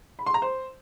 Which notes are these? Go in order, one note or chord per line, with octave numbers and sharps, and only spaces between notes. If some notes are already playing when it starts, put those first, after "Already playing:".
B5
C6
A#5
C5